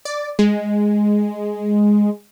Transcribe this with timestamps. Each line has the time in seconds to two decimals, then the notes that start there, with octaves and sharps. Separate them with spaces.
0.05 D5
0.39 G#3